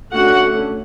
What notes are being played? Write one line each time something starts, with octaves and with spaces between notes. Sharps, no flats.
D3 A3 C#4 F#4 F#5